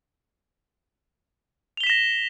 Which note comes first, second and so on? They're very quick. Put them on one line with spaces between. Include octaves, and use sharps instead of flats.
F7 G7 B6 E7 A#6